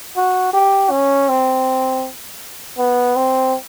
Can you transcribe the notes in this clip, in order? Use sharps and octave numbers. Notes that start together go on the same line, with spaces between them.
F#4
G4
C#4
C4
B3
C4